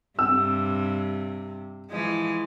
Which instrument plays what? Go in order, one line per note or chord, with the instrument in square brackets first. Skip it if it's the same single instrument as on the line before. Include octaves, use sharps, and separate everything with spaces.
[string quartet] G2 C3 [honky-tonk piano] E6
[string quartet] E3 F3 G#3